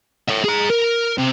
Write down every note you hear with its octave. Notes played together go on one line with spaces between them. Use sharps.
C#5 E5
G#4 A#5
A#4
C3